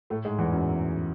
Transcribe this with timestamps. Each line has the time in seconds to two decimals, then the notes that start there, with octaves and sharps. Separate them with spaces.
0.10 A2 A3
0.25 G#2 G#3
0.38 E2 E3
0.53 F#2 F#3